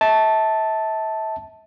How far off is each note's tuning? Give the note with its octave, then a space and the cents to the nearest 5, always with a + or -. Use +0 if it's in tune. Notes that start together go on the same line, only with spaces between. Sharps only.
E5 -35 A5 +0